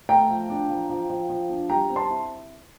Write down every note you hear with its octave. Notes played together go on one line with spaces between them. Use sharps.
A3 G5 A#5
F3
D4
F3
F3
F3
F3
D4
G3 G5 A#5
C4
A5 C6
E4